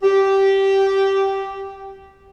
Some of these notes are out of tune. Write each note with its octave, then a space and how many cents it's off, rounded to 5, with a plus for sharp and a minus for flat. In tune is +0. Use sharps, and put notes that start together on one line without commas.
G4 -10